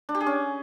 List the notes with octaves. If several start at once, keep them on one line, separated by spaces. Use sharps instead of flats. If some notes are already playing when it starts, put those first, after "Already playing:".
D4
G4
G#4
C#4